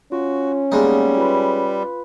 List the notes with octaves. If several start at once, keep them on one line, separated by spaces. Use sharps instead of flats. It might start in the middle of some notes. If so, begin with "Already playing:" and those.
C#4 F4 F#4
G3 G#3 A#3 B3 D#4
F4 B4 B5